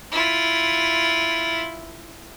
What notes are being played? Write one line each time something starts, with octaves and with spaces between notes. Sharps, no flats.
E4 F4